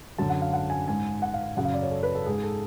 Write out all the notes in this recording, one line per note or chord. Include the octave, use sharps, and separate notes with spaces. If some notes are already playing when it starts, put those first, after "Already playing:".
F#2 D3 A5
F#5
F5
F#5
G#5
G#2 G#5
F#5
F5
F#2 C#3 F#5
F5
D5
C#5
A4
B4
A4
G#2 G#4
A4